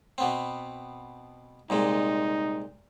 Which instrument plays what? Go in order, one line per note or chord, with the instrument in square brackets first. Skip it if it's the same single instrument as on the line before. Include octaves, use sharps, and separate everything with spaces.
[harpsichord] B2 B3 C4
[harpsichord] C2 A#2 G#3 [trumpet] D#4